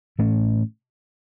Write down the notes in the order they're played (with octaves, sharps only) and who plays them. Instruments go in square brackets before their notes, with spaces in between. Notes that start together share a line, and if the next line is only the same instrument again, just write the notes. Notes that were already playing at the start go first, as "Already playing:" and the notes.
[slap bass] A2 E3 A3 C#4